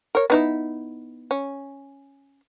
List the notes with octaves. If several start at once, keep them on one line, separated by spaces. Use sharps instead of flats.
A#4 C#5
B3 D#4 E4
C#4